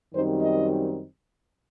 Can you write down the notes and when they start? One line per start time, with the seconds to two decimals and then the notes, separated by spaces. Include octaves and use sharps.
0.13 F#2 D#3 G3 C4 D#4 C5
0.42 D#5